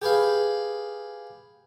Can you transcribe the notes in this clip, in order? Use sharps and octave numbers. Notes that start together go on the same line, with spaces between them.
G4 G#4 B4 F5